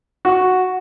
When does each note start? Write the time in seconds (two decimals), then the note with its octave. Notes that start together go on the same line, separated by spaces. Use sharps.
0.25 F#4